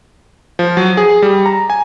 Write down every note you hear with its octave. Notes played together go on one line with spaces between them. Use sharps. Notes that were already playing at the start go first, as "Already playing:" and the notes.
F3
F#3
G#4
G3
A#5
G#5